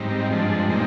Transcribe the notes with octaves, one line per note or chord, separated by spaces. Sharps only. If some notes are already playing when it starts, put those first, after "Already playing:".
Already playing: G#2 G3 C4 D#4
G2 F3 G#3 D4
A#2 G#3 C4 D#4